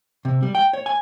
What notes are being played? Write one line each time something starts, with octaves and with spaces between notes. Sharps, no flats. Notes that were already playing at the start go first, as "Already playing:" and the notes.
C3
G3
G5
C#5
G#5